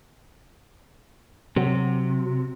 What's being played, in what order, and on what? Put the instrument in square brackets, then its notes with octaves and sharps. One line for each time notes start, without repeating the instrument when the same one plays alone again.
[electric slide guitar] C3 [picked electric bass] F#3